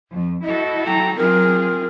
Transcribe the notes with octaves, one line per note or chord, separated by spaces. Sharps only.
F2
E4 F#4 A4 D#5
F#3 G5 A#5
F#3 C4 F4 G#4 A#4